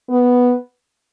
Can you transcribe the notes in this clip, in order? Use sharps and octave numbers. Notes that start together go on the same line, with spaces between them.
B3